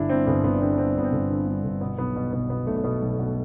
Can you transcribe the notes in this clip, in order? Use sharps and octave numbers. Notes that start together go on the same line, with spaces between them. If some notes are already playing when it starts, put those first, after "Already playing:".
Already playing: G1 D3 D4 E4
G2 C4
G1 B3
G1 B3
D4
D3 C4
D4
G2 C4
G1 B3
C4
G1
D3
G2
G1
B2 B3
B1 B3
B2
B1 B3
B2 B3
B1 A3
A3
B2 B3
B1
B2